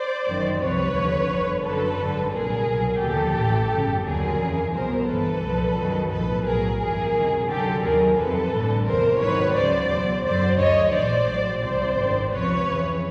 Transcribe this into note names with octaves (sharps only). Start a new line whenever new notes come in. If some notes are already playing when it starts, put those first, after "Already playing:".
Already playing: C5 D5
G1 F#2 D#3 F#3
C2 C3 F3 B4 C#5
D#2 D3 F3
G1 F2 D3
F#2 D3 F#3 A4 B4
G#1 G2 D3 F#3
C2 A#2 F#3 G#4 A#4
C2 B2 F#3
D#2 D3 F3 G4 A4
A1 A2 E3
G1 F#2 C#3
D#2 D3 F#3 G#4 A#4
F2 C#3 E3
C2 B2 F#3 A#4 C5
G1 G2 E3 A4 B4
C2 A#2 F3
F#2 D#3 F#3
B1 A2 F3 A4 B4
B1 A2 F#3 G#4 A#4
G1 G2 E3 G#4 A#4
C#2 C3 D#3 F#3
F#2 D3 F#3 G4 A4
D#2 D#3 F#3 G#4 A#4
F2 C3 F3 A4 B4
A1 G2 D3
E2 C3 E3 A#4 C5
G#1 G#2 D#3 F#3 B4 C#5
C#2 C#3 F#3 C5 D5
E2 B2 F#3
F#2 D3 F#3 C5 D5
D2 D3 F#3 C#5 D#5
A#1 G#2 E3 C5 D5
A#1 A2 F#3
C2 C3 E3 C5 D5
G#1 F#2 D#3
C#2 C3 F3 B4 C#5
F2 C#3 E3